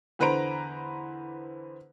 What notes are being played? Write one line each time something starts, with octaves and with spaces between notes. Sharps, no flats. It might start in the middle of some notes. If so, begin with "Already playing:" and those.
E2 D3 B4 C5 A#5 D7